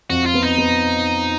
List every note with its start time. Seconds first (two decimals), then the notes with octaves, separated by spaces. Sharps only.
0.10 F2 F#4
0.26 F4
0.34 B3
0.42 D#4
0.58 B3